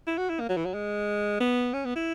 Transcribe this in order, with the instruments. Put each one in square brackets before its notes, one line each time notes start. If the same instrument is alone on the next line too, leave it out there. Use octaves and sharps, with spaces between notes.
[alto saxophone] E4
F#4
E4
A#3
F#3
E3
F#3
G#3
B3
C#4
B3
E4